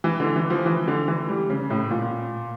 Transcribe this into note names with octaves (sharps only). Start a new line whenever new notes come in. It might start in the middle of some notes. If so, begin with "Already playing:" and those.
E3
D3
E3
F3
E3
D3
E3
G3
C#3
A2
A#2